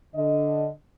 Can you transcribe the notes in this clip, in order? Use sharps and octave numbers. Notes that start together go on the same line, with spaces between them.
D3 D#5